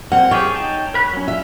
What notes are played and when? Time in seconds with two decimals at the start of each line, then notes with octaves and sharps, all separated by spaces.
0.12 A#3 C4 F#5
0.31 F4 G4 G#4 C#5
0.54 D#4 G5 A5
0.94 A#4 B5 F#6
1.13 F#3 C#4
1.28 F4 E5